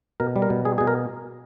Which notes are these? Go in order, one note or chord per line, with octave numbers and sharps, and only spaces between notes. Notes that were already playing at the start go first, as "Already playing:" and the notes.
B2 A#4
G3
A#4
B2
G3 G#4
B2 G#4
A#4